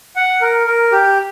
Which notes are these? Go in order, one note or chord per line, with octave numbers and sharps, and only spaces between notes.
F#5
A#4
A#4
G4